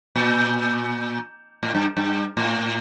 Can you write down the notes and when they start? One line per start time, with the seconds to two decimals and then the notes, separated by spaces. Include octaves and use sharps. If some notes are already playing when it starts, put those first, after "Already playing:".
0.16 A#2
1.63 A2
1.75 G2
1.97 G2
2.37 A2